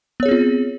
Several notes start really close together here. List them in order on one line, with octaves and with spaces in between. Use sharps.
B3 C#5 G#4 C4 F4